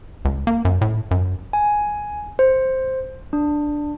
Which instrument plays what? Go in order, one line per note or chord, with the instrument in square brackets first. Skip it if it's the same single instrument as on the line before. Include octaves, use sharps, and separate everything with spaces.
[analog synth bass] C#2
A#3
F#2
A2
F#2
[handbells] G#5
C5
D4